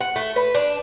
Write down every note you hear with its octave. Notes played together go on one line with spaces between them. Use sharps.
F#5
A3
B4
D4